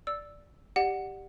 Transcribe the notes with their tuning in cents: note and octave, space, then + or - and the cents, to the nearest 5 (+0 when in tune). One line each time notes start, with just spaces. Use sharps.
D5 +0 E6 +0
G4 +0 D5 +25 F#5 +0